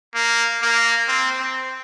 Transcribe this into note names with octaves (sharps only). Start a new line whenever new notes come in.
A#3
A#3
C4
C4